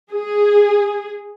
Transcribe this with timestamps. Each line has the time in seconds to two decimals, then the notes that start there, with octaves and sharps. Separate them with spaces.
0.12 G#4